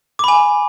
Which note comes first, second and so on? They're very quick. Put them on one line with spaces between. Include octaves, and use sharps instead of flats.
D6 B5 G#5